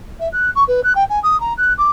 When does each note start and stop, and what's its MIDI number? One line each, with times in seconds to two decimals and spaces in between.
0.20 0.28 76
0.33 0.50 90
0.55 0.64 85
0.68 0.81 71
0.83 0.93 90
0.95 1.04 79
1.10 1.19 80
1.23 1.39 87
1.40 1.53 82
1.57 1.73 90
1.78 1.91 86